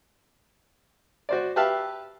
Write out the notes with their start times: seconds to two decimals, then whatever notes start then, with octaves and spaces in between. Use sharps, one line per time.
1.29 F#4 C5 D5
1.56 G4 B4 E5 F5 A5